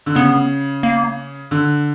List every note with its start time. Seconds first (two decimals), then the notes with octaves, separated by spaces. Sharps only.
0.06 D3
0.15 C#3 B3
0.83 A#3
1.51 D3